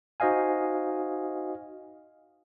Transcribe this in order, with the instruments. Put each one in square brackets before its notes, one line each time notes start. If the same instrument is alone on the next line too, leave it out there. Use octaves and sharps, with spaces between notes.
[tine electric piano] D#4 F#4 C5 D#5 F5 G#5